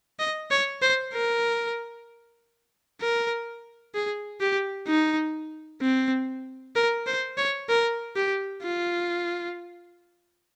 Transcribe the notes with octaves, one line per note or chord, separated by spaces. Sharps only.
D#5
C#5
C5
A#4
A#4
G#4
G4
D#4
C4
A#4
C5
C#5
A#4
G4
F4